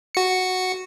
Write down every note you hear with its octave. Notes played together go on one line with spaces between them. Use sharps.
F#4 C#7